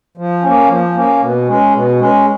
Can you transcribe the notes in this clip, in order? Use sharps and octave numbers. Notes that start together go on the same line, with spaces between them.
F3
A#3 C#4
F3
A#3 C#4
B2
G#3 C#4
B2
G#3 C#4